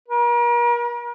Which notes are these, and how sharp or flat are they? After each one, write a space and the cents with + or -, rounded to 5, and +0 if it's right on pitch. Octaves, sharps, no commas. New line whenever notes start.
A#4 +40